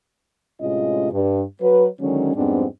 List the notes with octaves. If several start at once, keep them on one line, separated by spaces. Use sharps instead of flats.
A2 C3 G#3 C#4 F4 D#5
G2
F#3 B4
D3 D#3 F#3 G#3 C#4
F2 G#2 G3 B3 C4 D4